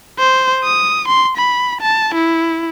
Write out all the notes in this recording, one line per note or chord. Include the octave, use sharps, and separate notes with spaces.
C5
D#6
C6
B5
A5
E4